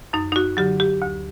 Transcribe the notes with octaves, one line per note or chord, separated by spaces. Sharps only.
F#2 D#4
D#4
F#4
D3 F#3 G4
G4
D2